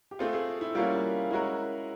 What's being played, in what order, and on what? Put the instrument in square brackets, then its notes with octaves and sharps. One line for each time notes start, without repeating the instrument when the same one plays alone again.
[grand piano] G4
[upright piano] A3 C4 F4 [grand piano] G#4
[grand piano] G#4
E4
[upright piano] G3 A#3 C#4 F#4 [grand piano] F4
[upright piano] G#3 C#4 F#4 A#4 [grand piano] E4